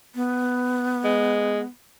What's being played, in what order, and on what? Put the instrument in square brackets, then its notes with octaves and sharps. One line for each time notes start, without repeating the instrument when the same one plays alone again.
[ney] B3
[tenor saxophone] G#3